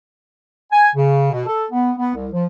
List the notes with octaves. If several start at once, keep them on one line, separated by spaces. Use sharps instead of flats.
G#5
C#3
B2
A4
B3
B3
C2
F3